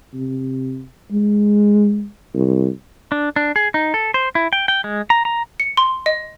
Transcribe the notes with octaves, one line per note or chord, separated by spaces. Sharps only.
C3
G#3
C2
D4
D4
G#4
D#4
A4
C5
E4
G5
G5
G#3
A#5
A#5
C#7
C6
D#5